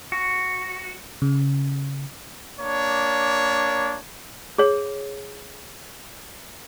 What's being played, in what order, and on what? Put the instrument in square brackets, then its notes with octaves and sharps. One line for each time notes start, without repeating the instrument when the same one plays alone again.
[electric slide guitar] F#4
[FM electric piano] C#3
[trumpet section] A#3 D4 C#5
[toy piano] G#4 C#5